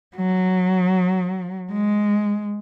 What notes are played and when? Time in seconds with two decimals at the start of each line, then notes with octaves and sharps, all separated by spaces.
0.16 F#3
1.72 G#3